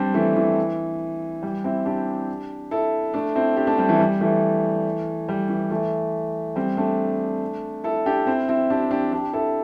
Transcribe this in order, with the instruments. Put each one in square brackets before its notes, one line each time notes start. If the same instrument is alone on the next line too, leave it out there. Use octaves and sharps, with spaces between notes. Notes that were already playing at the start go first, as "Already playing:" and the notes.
Already playing: [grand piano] G3 C4 D4
E3 A3
E3
G3
C4 E4
D4 G4
E4 A4
A3 D4
C4 E4
D4 G4
A3 D4
G3 C4
E3 A3
G3
E3 A3
G3
E3
E3 A3
G3 C4
A3 D4
E4 A4
D4 G4
C4 E4
C4 E4
D4 G4
D4 G4
D4 G4
E4 A4